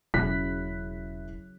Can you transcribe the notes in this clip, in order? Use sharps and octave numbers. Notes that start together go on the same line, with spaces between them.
E1 C#3 F#3 E4 F#6 B6